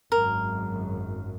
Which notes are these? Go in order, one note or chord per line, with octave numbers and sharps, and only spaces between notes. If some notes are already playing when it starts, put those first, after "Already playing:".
G#1 F#2 A#4